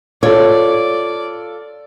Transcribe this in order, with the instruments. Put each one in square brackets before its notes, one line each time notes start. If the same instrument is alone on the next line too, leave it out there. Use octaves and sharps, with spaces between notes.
[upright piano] F4 A4 [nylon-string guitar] C#5 [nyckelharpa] D5